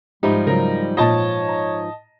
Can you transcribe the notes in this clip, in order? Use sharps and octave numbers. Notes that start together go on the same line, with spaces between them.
G#2 F3 G3 D#4 G4 E5 B5
C#3 F#3 A#4
A#2 F4 C#5 D#5 A5 A6
A#5